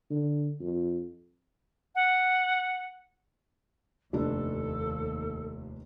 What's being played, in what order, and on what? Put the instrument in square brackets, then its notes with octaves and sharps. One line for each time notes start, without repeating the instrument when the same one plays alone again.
[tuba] D3
F2
[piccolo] F#5
[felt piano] F1 D4 [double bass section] D#2 [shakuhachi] A4